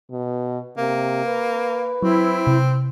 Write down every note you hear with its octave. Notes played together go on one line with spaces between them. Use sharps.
B2
C3 A#3
B4
F#3 C4 E4
C3